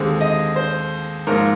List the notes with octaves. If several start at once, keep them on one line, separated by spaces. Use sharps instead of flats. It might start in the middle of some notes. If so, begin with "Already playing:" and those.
Already playing: D#2 D3 G#3 C4
D#5
C5
G#2 F3 A#3 A#4